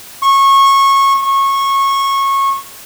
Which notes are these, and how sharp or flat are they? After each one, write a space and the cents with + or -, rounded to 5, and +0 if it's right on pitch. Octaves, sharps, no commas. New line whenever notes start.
C#6 -20
C#6 -20